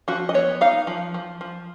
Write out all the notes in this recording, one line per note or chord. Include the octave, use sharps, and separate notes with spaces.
F3 F#4
D#5
B3 C#5
D#4 F5
F3
F3
F3